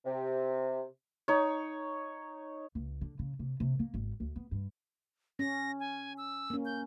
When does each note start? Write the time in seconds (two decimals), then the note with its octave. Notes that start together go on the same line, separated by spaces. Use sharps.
0.05 C3
1.28 D#4 C#5
2.75 C#2
3.01 D3
3.19 C#3
3.39 C3
3.60 C3
3.79 A#3
3.94 G#1
4.20 D2
4.36 B3
4.51 G2
5.39 C#4 A#6
5.80 G#5
6.18 E6
6.50 A#3 C#4
6.65 G6